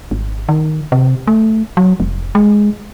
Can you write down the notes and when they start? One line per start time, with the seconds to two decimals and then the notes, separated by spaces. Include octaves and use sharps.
0.11 G#1
0.49 D#3
0.92 C3
1.27 A3
1.77 F#3
2.00 F1
2.35 G#3